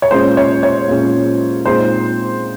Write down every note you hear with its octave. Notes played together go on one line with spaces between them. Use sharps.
C#5
A#2 G#3 C#4 C5
C#5
C#5
A#2 G#3 C#4
A#2 G#3 C4 D#4 C5